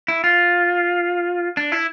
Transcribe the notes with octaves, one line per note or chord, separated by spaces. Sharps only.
E4
F4
D4
E4